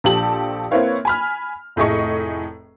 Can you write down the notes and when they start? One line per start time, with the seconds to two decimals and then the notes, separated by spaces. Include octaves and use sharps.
0.04 A#1 F3 G4 A4 A5 F#7
0.71 A#3 C4 E4 B4 C#5 F5
1.05 G#5 B5 F6
1.76 F1 A2 A3 G#4 D#5 C#6